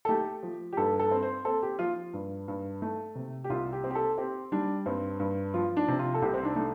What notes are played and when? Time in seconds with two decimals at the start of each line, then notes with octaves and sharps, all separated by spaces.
0.05 A4
0.09 A3 G4
0.43 F3
0.73 G4
0.77 G2 A4
0.99 A4
1.11 C4
1.23 C5
1.45 C4 A4
1.62 G4
1.79 F3 F4
2.13 G2
2.48 G2
2.82 A3
3.15 C3
3.44 G4
3.50 C2 F4
3.73 G4
3.84 C4
3.91 G4
3.95 A4
4.18 C4 G4
4.52 G3 D4
4.86 G2 C4
5.20 G2
5.54 F3 F4
5.77 D4
5.88 C3
5.99 F4
6.14 A4
6.22 C2 G4
6.34 C4
6.45 D4
6.56 A3